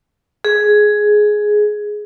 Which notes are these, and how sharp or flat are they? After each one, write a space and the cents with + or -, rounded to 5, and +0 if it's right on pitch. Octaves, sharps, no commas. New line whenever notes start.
G#4 +10